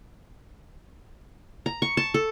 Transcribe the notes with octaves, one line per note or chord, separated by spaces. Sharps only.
A#5
C#6
A5
A4